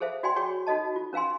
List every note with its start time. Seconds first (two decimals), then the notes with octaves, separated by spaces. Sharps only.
0.01 G#4 A4 C5 E5 F5
0.23 F#4 D5 G5 G#5 C6
0.36 F#4 G#4 C#5 G5 C#6
0.67 D#4 F#4 A4 D#5 A5
0.96 F4
1.13 C#4 A#4 F5 G#5 C6